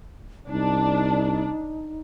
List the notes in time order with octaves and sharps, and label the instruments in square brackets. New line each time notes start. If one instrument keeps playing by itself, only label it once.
[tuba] C2 [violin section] D4 [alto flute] D#4